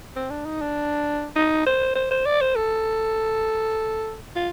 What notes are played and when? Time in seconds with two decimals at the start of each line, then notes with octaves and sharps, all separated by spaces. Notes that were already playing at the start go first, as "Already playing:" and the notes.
0.16 C4
0.30 D4
0.45 D#4
0.61 D4
1.36 D#4
1.66 C5
1.95 C5
2.11 C5
2.25 D5
2.41 C5
2.56 A4
4.36 F4